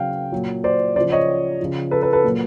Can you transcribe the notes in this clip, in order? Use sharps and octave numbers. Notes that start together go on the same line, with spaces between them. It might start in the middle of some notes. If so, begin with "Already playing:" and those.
Already playing: C#3 F#3 F5 G5
A#2 F#3
C5 D5
C#3 F3 C5 D5
C#5 D#5
C#3 F3
A4 B4
A4 B4
A4 B4
A#2 F#3